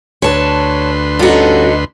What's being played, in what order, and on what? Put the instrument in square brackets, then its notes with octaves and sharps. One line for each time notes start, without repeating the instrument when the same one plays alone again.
[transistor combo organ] D2 B4 C6 [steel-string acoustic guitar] C#5 A5
[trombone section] G2 C#4 A4 [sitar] D3 D#4 [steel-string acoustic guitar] F4 F#4